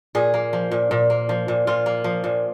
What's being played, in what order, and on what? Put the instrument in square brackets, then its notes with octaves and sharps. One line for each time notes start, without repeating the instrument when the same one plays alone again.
[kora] A#2 G#4
A#3
F3
A#2
A#2
A#3
F3
A#2
A#2 F4
A#3
F3
A#2